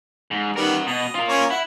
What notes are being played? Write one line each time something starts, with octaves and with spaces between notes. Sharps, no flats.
G#2
D#3 G3 B3 A#4 F#5
B2 D#5
F4 A#4
A#3 C#4 C#5
E4 F#5